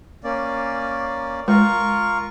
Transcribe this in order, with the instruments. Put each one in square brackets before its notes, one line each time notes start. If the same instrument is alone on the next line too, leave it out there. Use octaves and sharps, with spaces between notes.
[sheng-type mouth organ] A#3 C#4 D5
[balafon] G#3 [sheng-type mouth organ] F4 A#4 C#6